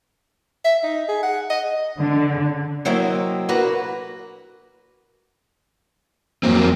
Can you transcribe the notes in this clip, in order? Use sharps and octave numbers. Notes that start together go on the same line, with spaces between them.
E5
D#4
G#4
F#5
D#5
D3
C3 F#3 A#3 C4 E4 D#5
D2 A#3 F#4 B4
F2 F#3 A#3 C4